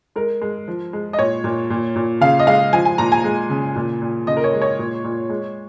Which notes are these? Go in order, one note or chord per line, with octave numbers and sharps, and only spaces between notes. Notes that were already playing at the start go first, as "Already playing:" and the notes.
G#3 A#4
G#3
F3
G#3
D#5
A#2 C#5
A#2
A#2
A#2
C#3 F5
D#5
G#3 F5
F3 G#5
G#5
A#2 A#5
G#5
G#3
C#3
A#2
A#2
C#3 D#5
A#4
C#5
G#3
C#5
A#2
A#2
G#3